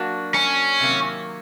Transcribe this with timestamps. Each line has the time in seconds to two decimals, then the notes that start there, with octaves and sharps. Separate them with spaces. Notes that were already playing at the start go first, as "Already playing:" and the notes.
Already playing: F#3 A#3 D4 F#4
0.34 C#4
0.80 C3 D#3 F#3 A#3